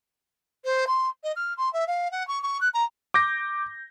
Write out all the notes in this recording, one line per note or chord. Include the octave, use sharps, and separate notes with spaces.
C5
C6
D#5
F6
C6
E5
F5
F#5
C#6
C#6
F#6
A#5
D6 G6 A#6